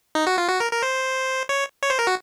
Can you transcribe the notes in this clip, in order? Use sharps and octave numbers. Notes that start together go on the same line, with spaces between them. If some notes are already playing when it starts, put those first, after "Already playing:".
D#4
F#4
F4
F#4
A#4
A#4
C5
C#5
C#5
C5
A#4
F#4